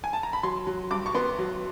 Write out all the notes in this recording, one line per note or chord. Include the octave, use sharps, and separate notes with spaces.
G#5
A5
A#5
B5
F#3 C6
F#3
G2 D6
C#6
B3 C6
F#3